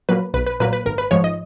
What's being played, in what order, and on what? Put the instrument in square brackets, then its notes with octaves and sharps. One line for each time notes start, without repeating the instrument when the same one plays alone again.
[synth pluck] A#2 F#3 A#3 B4
B1 B4
B4
A#2 F#3 A#3 B4
B4
G#1 A#4
B4
G#2 F3 G#3 C#5
D#5